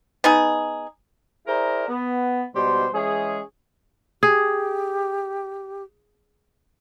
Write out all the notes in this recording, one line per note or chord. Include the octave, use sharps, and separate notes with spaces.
B3 D#4 G#4
E4 G#4 A#4 C5 D5 A#5
B3
G#2 B2 G3 G4 C5
E3 G#3 C#4 G#4
G4 G#4